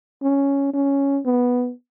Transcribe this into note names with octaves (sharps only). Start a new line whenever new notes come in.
C#4
C#4
B3